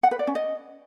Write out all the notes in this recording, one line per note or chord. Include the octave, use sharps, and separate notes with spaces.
F#5
B4
D5
C#4
D#5